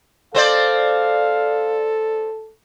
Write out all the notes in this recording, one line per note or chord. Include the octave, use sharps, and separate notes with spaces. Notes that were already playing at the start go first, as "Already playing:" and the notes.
C4 A4 C5 D5 F5